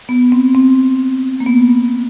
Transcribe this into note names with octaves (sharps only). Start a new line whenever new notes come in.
B3
C4
C4
A#3
B3